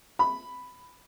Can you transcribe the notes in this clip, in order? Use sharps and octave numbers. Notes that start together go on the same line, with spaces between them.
B5